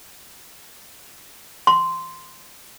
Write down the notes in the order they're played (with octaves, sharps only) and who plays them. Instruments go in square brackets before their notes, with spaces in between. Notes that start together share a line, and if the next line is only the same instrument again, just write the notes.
[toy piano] C6